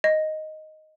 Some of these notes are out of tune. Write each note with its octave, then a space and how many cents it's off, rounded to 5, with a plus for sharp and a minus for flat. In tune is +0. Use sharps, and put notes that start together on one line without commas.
D#5 +0